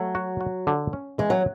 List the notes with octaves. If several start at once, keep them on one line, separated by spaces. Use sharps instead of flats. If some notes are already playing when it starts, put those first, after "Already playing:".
Already playing: F#3 A3
F#4
F#4
D3
C#4
E3 G#3
F#3